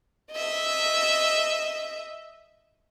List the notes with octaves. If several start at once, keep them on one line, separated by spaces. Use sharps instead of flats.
D#5 E5